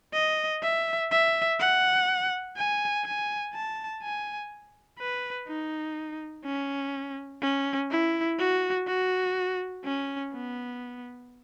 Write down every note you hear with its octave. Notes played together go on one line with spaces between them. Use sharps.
D#5
E5
E5
F#5
G#5
G#5
A5
G#5
B4
D#4
C#4
C#4
E4
F#4
F#4
C#4
B3